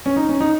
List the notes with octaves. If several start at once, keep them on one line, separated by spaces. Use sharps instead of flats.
C#4
D#4
C#4
D#4